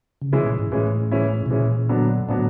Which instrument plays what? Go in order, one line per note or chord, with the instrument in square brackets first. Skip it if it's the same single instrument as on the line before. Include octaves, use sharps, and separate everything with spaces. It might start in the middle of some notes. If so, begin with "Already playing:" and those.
[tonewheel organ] C#3
[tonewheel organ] C3 [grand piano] E3 G#3 C#4 E4
[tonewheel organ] A#2
G#2
[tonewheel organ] A2 [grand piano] E3 G#3 C#4 E4
[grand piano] E3 G#3 C#4 E4
[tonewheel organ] B2
[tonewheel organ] A#2 [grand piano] E3 G#3 C#4 E4
[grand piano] D3 F#3 B3 D4
[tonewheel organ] A2 [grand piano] D3 F#3 B3 D4